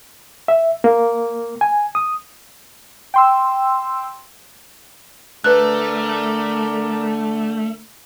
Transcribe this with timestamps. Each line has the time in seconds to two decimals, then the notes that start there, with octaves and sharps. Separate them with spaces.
0.48 E5
0.84 A#3
1.61 G#5
1.95 D#6
3.14 G5 C6 E6
5.44 D3 A3 A#4 B4 D5 F#6